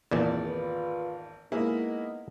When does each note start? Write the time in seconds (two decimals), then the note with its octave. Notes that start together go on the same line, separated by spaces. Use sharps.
0.11 G#1 E2 A#2 D#3 E3 D5
0.46 F4 B4
1.52 G#3 A#3 B3 D#4 E4